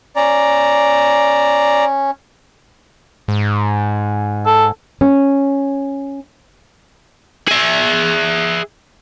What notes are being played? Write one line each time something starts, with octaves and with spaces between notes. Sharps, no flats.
C#4 D5 A#5
G#2
A4
C#4
G#4 E5